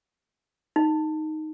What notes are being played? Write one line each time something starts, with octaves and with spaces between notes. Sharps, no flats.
D#4